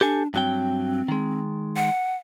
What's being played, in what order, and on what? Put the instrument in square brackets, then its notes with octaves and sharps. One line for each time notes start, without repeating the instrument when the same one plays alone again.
[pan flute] D4 [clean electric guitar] G4 A4 G#5
[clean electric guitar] G2 F#3 G5 [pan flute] C4
[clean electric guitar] D#3 G#3
[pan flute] F#5